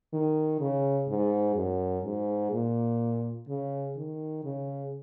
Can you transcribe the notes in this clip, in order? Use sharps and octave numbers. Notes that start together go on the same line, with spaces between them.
D#3
C#3
G#2
F#2
G#2
A#2
C#3
D#3
C#3